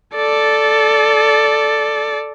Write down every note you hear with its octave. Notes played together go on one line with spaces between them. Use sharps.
A4 D5